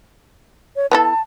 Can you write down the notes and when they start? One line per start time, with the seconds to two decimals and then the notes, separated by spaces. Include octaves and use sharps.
0.76 C#5
0.91 B3 E4 A4 A5